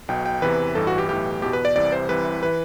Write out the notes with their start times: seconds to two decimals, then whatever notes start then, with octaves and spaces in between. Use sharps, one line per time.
0.08 B1 B2 G5
0.26 G5
0.42 E2 C3 E3 B4
0.75 A1 G2 E3 A4
0.87 F#4
0.98 G4
1.09 B1 A2 E3 G4
1.42 E2 B2 G4
1.53 B4
1.65 D5
1.76 C2 C3 E3 D5
1.92 C5
2.09 C2 C3 E3 B4
2.43 E3 B4